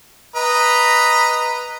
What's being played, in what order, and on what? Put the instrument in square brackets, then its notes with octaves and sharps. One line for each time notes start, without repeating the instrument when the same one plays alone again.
[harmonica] B4 D#5 A#5